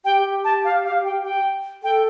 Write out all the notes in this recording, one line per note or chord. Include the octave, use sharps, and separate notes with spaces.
G4 G5
A5
F5
F5
G5
G5
A4 G5